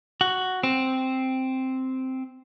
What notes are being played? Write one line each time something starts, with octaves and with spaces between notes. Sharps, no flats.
F#4
C4